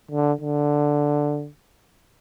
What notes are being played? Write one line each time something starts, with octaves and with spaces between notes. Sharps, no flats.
D3
D3